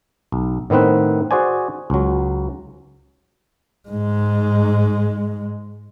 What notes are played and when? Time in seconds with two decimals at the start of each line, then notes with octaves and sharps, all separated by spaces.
0.32 B1
0.70 A2 D#3 B3 C4 B4
1.31 F#4 G#4 C5 D5 G#5
1.90 C#2 F#3
3.89 G#2 G#3